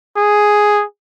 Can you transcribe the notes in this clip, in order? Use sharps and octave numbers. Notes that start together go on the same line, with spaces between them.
G#4